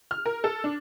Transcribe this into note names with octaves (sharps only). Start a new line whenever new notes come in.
F6
A#4
A4
D4